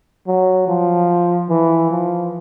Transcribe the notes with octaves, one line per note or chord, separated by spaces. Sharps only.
F#3
F3
E3
F3